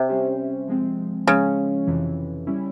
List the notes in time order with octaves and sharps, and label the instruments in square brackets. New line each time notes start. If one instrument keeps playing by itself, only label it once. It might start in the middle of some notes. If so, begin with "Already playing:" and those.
Already playing: [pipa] C3
[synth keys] G3 C#4 G4 C5
F3 G#3 C4
[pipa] C#3 [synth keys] F3 G#3 C#4
[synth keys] F2 C3 E3
G3 C#4 E4